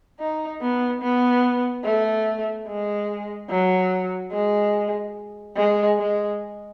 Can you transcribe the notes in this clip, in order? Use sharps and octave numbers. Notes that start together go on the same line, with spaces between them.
D#4
B3
B3
A3
G#3
F#3
G#3
G#3
G#3